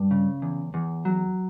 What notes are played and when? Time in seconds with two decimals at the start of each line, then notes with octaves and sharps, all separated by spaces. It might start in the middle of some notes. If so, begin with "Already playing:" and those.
Already playing: G2
0.11 C#3
0.42 E2
0.74 E2
1.05 F#3